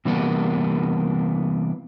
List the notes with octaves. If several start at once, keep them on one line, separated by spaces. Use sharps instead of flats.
C3 E3 G3 A#3 B3